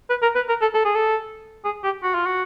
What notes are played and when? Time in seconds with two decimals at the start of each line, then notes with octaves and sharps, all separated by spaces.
0.10 B4
0.22 A#4
0.36 B4
0.49 A#4
0.62 A4
0.74 A4
0.85 G#4
0.95 A4
1.65 G#4
1.84 G4
2.03 F#4
2.15 F4
2.26 F#4